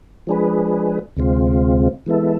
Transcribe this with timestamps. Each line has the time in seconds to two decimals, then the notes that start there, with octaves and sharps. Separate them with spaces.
0.27 F3 G#3 D4 G#4 B4
1.17 D2 C3 G#3 C4 F4
2.06 E3 G#3 B3 E4 A4